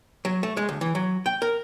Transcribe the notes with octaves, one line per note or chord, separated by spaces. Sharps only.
F#3
A3
G#3
D2
E3
F#3
G5
A#4